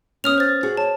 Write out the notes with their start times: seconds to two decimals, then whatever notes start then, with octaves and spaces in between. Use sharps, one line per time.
0.24 B3 C#4 D#6 F6 F7
0.38 C5 A6
0.63 F#4 G#4
0.77 C#5 A5